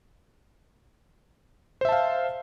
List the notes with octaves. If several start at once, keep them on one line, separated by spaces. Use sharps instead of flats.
C5 E5 F5 A5